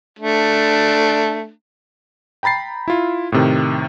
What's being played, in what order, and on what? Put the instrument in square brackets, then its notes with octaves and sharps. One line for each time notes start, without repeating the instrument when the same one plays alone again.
[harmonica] A3 D4
[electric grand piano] G5 A#5 B5 A6 C7
E4 F4
A2 C3 D#3